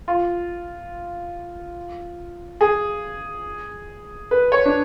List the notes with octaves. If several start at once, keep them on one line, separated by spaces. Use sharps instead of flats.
F4
G#4
B4
C#5
D4